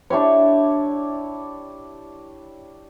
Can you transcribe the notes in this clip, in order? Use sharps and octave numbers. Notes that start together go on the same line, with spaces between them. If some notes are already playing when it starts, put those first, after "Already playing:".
D4 E4 G4 C#5